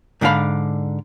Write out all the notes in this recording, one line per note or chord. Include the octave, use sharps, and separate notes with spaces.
G#2 D3 D4 G4 F5 B5